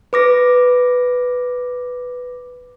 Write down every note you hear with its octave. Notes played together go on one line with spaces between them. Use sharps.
B4 D6 A#6